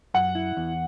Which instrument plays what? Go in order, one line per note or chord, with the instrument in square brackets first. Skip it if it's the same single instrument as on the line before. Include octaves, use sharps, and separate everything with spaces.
[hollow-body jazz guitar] F#2 [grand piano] F#5
[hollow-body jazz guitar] E4
E2